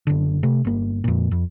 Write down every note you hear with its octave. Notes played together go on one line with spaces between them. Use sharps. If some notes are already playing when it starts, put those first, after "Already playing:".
F#1 D3
C3 A3
G1 A#3
F2 A#2
F2